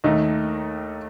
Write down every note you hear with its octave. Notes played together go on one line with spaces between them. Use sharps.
D#2 D#3 A3 D#4